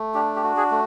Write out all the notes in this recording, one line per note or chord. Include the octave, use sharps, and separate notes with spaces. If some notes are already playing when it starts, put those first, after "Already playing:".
Already playing: A3
D4 G4
G4
F#4
G#4
A3